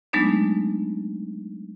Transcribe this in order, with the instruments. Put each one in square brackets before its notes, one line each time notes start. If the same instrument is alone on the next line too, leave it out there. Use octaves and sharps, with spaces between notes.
[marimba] F#3 G#3 A3 B3 D4 D#4